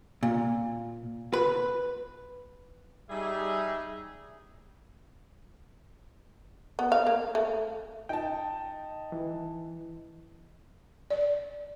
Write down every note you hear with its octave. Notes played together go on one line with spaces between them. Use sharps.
A#2
B4
G3 D#4 G#4 E5
B3
F5
A#3
A3
D#4 G5 A5
E3
D5